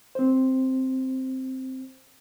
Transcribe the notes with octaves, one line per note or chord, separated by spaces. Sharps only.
C4 C5